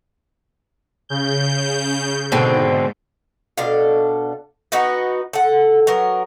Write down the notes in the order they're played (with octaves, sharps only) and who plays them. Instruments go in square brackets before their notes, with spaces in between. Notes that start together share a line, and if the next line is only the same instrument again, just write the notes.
[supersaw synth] C#3 G6
[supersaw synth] G#2 [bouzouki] B2 D3 C4
[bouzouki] B2 D4 A4 F5
B3 D#4 F#4 B4
A4 F#5
F#3 B3 A#4